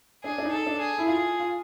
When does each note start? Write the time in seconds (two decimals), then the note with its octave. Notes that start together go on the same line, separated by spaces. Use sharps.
0.24 D4 G#4
0.38 D4
0.45 D#4
0.51 A4
0.66 D4
0.80 G#4
0.98 E4
1.07 F4 G#4
1.40 F4